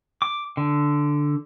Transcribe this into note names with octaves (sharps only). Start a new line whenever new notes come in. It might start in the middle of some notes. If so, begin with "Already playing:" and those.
D6
D3